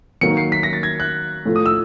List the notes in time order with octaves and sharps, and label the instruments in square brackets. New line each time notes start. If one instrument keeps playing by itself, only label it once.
[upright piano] D#3 F#3 A#3 [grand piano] C#7
[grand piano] C7
B6
A#6
A6
G#6
F#6
[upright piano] A2 F3 A3
[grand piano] D#6
E6